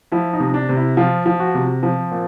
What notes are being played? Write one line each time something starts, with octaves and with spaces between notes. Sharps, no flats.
F3 E4
D#4
C3
D4
C3
E4
F3 F4
F3
F#4
C3
F3 C4
A#2